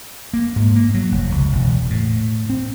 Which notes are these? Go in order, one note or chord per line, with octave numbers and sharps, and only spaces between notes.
A#3
G#2
A#3
F#3
F1
C#2
E1
A2
C4